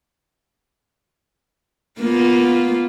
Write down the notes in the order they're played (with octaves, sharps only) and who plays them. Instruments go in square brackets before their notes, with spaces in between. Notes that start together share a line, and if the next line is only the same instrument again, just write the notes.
[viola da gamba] A#3 B3 F4